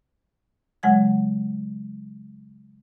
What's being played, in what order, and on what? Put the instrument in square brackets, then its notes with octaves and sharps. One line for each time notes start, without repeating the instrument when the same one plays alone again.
[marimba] C#3 F#3 G#3 F#5 G#6